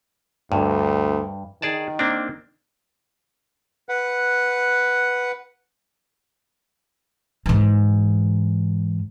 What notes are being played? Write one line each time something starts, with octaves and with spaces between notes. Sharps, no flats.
D2 G2
D#3 G#4 D5 A5
A#3 C4 D4
B4 F#5
G#2 E3